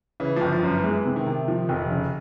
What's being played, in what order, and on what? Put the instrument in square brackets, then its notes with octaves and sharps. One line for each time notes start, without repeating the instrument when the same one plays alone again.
[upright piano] C#3 [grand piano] E3
[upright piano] G1 [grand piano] F3
[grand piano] F3
[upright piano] F#2
[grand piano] E3
[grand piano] E3 [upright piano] G#3
[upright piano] C3
[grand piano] D#3
[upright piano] C3
F3
F1
C#3